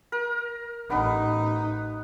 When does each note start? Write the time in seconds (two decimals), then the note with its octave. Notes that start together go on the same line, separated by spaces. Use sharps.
0.12 A#4
0.90 A1 B3 D#4 B4